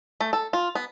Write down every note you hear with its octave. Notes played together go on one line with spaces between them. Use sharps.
A3
A4
F4
B3